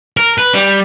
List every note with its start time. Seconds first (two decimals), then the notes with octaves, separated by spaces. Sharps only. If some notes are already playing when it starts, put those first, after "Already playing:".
0.17 A#4
0.38 B4
0.54 G3